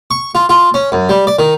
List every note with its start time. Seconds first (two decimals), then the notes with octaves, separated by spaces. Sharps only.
0.11 C#6
0.35 F4
0.49 F4
0.74 C#4
0.92 F#2
1.09 G3
1.27 D5
1.39 D#3